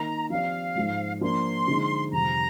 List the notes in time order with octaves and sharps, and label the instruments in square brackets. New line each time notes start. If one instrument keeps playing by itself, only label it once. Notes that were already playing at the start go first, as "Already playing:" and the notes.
Already playing: [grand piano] D#3 A#3 D#4 A#4 D#5 [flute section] A#5
[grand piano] F3 C4 G4 D5 [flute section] F5
[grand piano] G#2 F3 G#3
[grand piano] F3 A#3 D4 [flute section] C6
[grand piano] D3 F3 G#3 D#4 G#4
[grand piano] F2 C3 D#3 G3 [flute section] A#5